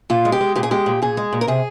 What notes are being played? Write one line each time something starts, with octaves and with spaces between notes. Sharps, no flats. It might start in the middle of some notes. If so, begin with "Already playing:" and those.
A#2 F4
G#3
G4
G#3
A#2 G4
G#4
G#3 G4
A#2
A#2 G#4
G#3
A#2
A#4
C3 G#4